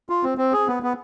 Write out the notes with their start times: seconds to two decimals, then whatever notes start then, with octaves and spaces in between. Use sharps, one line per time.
0.09 F4
0.23 C4
0.38 C4
0.53 G#4
0.68 B3
0.83 B3